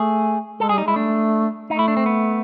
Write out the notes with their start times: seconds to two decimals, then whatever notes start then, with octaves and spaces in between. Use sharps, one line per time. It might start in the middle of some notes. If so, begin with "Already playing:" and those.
Already playing: A3 G#4
0.60 G#3 A4
0.69 G#4
0.72 G3
0.78 D#4
0.85 G#3 E4
0.96 A3 D4
1.70 A3 D#4
1.79 E4
1.88 D4
1.97 C4
2.06 B3